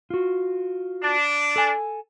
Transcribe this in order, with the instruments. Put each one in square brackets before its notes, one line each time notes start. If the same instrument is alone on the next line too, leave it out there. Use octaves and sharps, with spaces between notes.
[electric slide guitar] F4 F#4
[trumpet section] D4
[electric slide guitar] A4 G#5